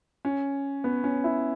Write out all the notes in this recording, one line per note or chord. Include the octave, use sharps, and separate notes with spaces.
C#4
B3
C#4
E4